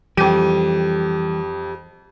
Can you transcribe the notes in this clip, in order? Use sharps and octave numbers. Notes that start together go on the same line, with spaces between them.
F2 E3 G3 G4 D#7